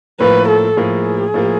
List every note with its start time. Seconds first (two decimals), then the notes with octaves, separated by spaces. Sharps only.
0.20 A2 F3 A#3 B4
0.49 A4
0.77 A2 F3 A#3 G#4
1.34 A2 F3 A#3